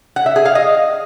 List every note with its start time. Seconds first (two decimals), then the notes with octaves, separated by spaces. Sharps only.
0.16 F#5
0.26 E5
0.36 G#4
0.45 F5
0.55 D#5